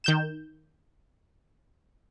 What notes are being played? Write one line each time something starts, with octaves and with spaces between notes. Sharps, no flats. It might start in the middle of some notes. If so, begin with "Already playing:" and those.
D#3 G6 E7